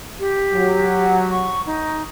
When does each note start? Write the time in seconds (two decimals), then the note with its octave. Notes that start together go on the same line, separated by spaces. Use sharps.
0.19 G4
0.53 F#3
1.30 C#6
1.66 D#4